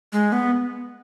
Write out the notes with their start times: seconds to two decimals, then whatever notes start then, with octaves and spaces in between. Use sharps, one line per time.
0.13 G#3
0.32 B3